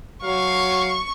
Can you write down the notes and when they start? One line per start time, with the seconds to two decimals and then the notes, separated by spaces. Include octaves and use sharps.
0.24 F#3 F5 C#6